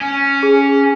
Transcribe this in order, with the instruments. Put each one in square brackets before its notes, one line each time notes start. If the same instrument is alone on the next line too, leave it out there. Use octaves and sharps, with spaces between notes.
[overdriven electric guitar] C#4
[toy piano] G#4